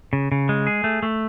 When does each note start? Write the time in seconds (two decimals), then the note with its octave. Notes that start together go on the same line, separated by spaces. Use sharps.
0.13 C#3
0.32 C#3
0.49 G#3
0.67 G#4
0.84 A3
1.03 A3